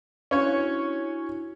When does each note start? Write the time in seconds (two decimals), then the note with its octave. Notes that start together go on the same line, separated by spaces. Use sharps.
0.31 C#4 D4 E4 F#4 C#5